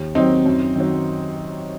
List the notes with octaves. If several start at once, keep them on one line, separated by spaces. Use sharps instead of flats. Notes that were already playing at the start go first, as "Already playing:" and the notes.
Already playing: D#2
D#3 F#3 C4 D#4
F#2
D#3 F#3